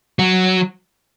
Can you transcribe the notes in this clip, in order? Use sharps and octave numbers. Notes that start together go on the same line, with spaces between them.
F#3